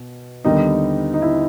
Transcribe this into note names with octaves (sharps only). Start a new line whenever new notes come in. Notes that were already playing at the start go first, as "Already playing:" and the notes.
Already playing: B2
D#2 D3 G3 B3 D#4
D#4
E4